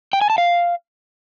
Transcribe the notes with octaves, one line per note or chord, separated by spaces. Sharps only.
G5
G#5
A5
F5